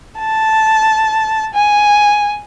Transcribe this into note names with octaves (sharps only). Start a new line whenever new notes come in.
A5
G#5